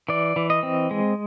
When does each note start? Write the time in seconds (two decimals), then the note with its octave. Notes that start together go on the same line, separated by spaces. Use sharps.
0.09 E3 D5
0.36 E3
0.50 D#5
0.63 C4
0.91 G#3